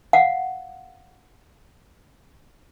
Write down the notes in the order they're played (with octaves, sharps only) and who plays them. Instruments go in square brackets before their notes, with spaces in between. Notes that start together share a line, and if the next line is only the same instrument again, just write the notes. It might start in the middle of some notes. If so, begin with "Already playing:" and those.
[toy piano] F5 F#5